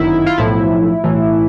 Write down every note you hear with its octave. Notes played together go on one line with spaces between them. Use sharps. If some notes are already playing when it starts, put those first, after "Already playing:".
Already playing: G1 F#2 D#3 E4
F4
B1 A2 F3 E4
B1 A2 E3